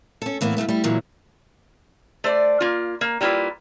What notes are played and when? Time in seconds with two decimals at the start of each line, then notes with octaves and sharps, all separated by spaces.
0.22 C#4 A4
0.41 A2 E3 A#3 B3
0.57 C#3 G3 A3 B3
0.69 G3 E4
0.84 A#2 D3 E3 F#3 G#3
2.24 A3 C5 D5
2.61 A#3 F4
3.01 A#3
3.21 G3 A#3 E4 F4 B4